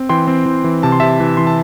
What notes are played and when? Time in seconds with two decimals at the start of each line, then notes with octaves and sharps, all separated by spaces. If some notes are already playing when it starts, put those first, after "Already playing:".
Already playing: C4
0.09 E3 G5 C6
0.27 C4
0.46 E3
0.64 E3
0.83 C3 A5
0.92 C6
1.00 C3 E5 A5
1.20 E3
1.37 E3 C6
1.47 A5